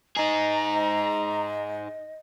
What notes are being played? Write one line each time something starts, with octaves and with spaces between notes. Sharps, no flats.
D#4 G#4 D#5 A#5